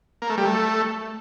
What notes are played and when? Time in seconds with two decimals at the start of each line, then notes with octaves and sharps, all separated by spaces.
0.22 A#3
0.30 A3
0.38 G3
0.45 A3